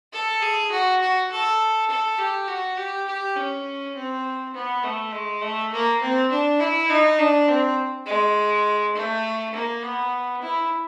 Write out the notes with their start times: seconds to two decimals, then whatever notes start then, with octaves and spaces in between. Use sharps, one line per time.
0.12 A4
0.42 G#4
0.71 F#4
1.01 F#4
1.31 A4
1.90 A4
2.19 G4
2.48 F#4
2.77 G4
3.07 G4
3.36 C#4
3.94 C4
4.54 B3
4.83 A3
5.13 G#3
5.41 A3
5.72 A#3
6.01 C4
6.31 D4
6.60 E4
6.89 D#4
7.19 D4
7.48 C4
8.06 G#3
8.95 A3
9.54 A#3
9.82 B3
10.42 E4